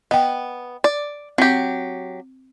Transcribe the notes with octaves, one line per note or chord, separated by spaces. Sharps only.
B3 D#5 G5
D5
F#3 C4 G4